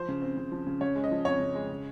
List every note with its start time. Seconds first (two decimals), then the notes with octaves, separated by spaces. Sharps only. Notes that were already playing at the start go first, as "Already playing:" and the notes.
Already playing: F3 C5
0.08 C#3
0.22 C4
0.37 C#3
0.52 F3
0.67 C#3
0.81 C#3 C#5
0.96 G#3
1.04 D#5
1.11 F3
1.25 F2 C#5
1.40 C#3
1.55 G#3
1.69 C#3